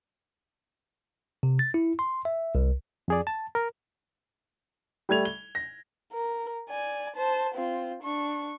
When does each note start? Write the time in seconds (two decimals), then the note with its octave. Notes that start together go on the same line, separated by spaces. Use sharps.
1.43 C3
1.59 A6
1.74 E4
1.99 C6
2.25 E5
2.55 C2
3.08 F2 G#4 D5
3.27 A5
3.55 A#4
5.09 G3 A3 G#6 F7
5.25 G7
5.55 A#6
6.13 A#4
6.70 D5 G#5
7.16 C5 A5
7.55 C4 F4
8.03 D4 C#6